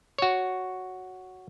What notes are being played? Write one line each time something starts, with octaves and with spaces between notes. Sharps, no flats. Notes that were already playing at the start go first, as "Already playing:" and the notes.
F#4 C#5